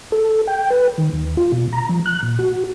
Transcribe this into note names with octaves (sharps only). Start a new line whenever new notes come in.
A4
G5
B4
D#3
D#2
F4
B2
A#5
F3
F#6
A#2
F#4